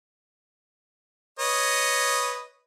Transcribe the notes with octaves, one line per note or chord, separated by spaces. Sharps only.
B4 C#5 D#5